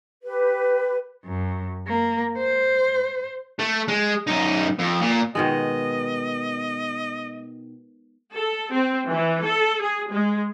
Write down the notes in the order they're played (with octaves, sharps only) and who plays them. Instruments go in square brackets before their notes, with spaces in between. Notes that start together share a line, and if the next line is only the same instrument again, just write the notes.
[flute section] G4 B4
[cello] F#2
A#3
C5
[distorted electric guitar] A3
G#3
F#2 D#4
F2
A#2
[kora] B2 D#3 G#3 [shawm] D#5
[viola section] A4
C4
E3
A4
G#4
G#3